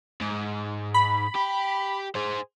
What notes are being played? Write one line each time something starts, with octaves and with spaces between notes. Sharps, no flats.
G#2
B5
G4
G#4 C5